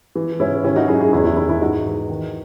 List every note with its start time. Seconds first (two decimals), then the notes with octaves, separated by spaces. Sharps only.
0.16 E3
0.40 G#2 C#4 E4
0.64 D#3 C#4 E4
0.76 D#4 F#4
0.88 F#2 E4 G#4
1.00 E4 G#4
1.12 E2 E4 G#4
1.24 E4 G#4
1.37 D#3 E4 G#4
1.49 E4 G#4
1.61 G#2 D#4 F#4
1.85 E3
2.10 D#3